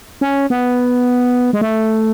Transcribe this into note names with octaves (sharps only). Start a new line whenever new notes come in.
C#4
B3
G#3
A3